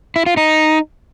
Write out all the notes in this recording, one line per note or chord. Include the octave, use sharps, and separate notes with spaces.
E4
F4
D#4